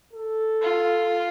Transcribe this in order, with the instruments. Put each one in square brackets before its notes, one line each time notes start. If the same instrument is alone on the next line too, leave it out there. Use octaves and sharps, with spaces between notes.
[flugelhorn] A4
[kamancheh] F4